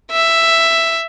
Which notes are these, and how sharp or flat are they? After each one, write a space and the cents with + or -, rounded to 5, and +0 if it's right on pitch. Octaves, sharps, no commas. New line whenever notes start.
E5 +5